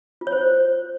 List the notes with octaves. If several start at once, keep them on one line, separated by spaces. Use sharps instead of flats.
F4
C#5
C5